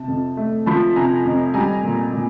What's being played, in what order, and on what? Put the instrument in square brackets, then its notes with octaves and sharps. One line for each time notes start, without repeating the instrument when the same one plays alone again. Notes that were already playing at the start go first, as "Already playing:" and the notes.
Already playing: [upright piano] C3 A5
F2
A3
F3 A5 B5
C3 G#5 A#5
F2
G3 G#5 A#5
A#2
A#2